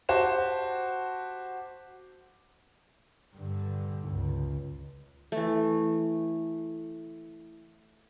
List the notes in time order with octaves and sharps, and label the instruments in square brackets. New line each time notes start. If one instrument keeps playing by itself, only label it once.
[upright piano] F#4 G4 C5 A5 E7
[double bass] G2 D3
C#2
[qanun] E3 A3